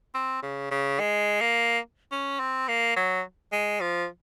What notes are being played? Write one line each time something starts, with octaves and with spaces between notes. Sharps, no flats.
C4
C#3
C#3
G#3
A#3
C#4
C4
A#3
F#3
G#3
F3